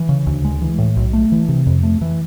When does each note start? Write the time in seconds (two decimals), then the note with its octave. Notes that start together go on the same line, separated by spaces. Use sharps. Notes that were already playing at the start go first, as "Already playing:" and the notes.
Already playing: E3
0.09 C#3
0.27 D2
0.45 G#3
0.61 E3
0.78 A2
0.97 B1
1.13 A3
1.32 E3
1.49 C3
1.67 F2
1.83 A3
2.01 E3